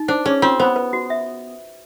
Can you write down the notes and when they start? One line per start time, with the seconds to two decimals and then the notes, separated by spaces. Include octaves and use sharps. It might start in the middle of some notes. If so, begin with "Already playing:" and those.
Already playing: D#4
0.08 D4 C5
0.26 C#4 G#4
0.42 C4 F4
0.59 B3 C5
0.76 B4
0.93 F#4
1.10 E5